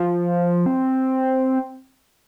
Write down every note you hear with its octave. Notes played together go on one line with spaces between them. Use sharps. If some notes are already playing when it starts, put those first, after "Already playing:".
Already playing: F3
C4